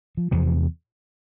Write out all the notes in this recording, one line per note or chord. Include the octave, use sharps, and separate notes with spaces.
F3
E2 C3 F3